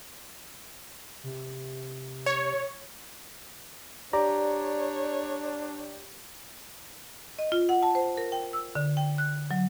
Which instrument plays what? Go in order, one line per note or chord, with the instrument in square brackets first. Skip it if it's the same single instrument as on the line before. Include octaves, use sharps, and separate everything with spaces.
[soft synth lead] C3
[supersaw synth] C#5
[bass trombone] D4 [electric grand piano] G4 [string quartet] C#5 [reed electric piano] D5 A#5
[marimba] D#5
F4
F#5
A5
C5
A#4
G5
E6
D3
G5
F#6
F#3